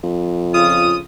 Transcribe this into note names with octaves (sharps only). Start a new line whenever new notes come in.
F2
C#3 F4 D#6